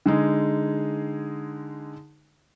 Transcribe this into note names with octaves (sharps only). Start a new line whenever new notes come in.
D3 G#3 D#4 G#4